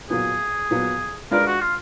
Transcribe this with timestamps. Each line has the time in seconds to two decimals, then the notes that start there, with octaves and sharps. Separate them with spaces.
0.10 A#2 F#3 B3 G#4
0.71 A#2 F#3 B3
1.31 G#3 D4 F4 A#4 B4 D5
1.47 F#4
1.61 F4